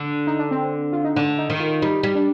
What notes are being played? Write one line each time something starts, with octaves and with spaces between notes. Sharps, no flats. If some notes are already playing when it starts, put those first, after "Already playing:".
Already playing: D3 D4
D#4
D4
C4
F4
D#4
D3 D4
D#4
D#3
F4
G3 D#4
G3
D4